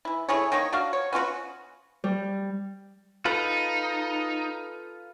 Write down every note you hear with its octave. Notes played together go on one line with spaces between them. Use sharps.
E3 E4
A3 E4 G#4 C#5
D#3 A#3 D#4 C#5
D4 F#4 F5
C#5
B3 C#4 F4 F#4
G3
D#4 F4 A4 B4